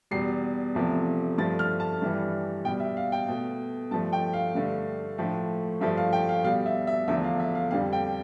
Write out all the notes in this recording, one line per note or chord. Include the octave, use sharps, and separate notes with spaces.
E2 B2 G3 C7
E2 C3 F3 A3
G2 F3 A3 A6
F6
A5
G2 E3 G3
B2 G3 G5
E5
F5
G5
B2 A3
G2 F3 A3 A5
G5
F5
G2 D3 A3
A2 F3 A3
G2 F3 A3 E5
F5
G5
F5
B2 G3 F5
E5
E5
E2 D3 F3 A3 E5
F5
E5
F5
F2 D3 G3 F5
G5